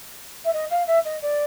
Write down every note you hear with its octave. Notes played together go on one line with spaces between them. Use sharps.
E5
D#5
F5
E5
D#5
D5